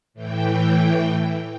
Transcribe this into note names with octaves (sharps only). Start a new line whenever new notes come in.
A2 E3 G5